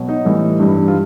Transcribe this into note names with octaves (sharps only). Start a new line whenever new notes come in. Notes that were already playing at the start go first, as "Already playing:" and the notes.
Already playing: B2 F#3
D#4
A2 E3 G3
G2 E3 G3
F4